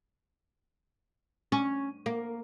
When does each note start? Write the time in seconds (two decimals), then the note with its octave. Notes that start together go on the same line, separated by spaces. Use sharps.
1.52 C#4
2.06 A#3